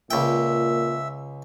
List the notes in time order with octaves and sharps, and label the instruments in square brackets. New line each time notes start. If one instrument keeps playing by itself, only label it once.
[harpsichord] C#2 G5 [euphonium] A#2 [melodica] E5